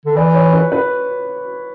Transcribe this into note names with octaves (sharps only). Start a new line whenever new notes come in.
D3
E3 D5
C#5
B4
B4